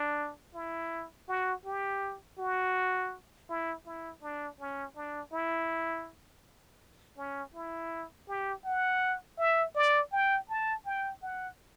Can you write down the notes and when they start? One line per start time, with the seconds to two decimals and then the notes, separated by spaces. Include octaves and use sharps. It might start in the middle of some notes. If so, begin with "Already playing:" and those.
Already playing: D4
0.54 E4
1.28 F#4
1.65 G4
2.39 F#4
3.49 E4
3.86 E4
4.23 D4
4.60 C#4
4.96 D4
5.33 E4
7.18 C#4
7.54 E4
8.28 G4
8.65 F#5
9.38 E5
9.75 D5
10.12 G5
10.49 A5
10.86 G5
11.22 F#5